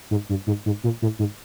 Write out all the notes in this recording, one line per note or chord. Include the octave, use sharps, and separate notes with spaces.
G#2
G2
G#2
G#2
A#2
A2
G#2